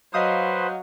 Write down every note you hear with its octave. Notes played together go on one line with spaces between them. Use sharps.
F#3 B4 C5 D#5 F5 D#6